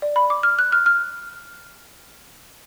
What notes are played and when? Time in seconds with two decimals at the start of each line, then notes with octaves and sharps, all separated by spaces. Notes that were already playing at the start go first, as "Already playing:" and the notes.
0.02 D5
0.16 B5
0.30 D6
0.43 F6
0.59 F#6
0.72 F6
0.86 F6